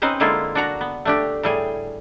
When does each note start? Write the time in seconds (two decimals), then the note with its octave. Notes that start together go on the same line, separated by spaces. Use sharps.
0.02 C4 C#4 D#4 B4 C5
0.20 D3 G#3 A#3 E4 F4
0.55 D4 F#4 A#5
0.81 B3
1.05 A3 D4 G4
1.43 A2 G3 G#4